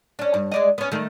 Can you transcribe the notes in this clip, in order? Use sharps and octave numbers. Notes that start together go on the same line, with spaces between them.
C#4 D4
G2
G#3 D4 D#5
B3 C#4
D#3 A3